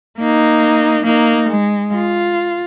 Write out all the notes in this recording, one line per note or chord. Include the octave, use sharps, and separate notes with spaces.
A#3 D#4
A#3 D#4
G#3
F4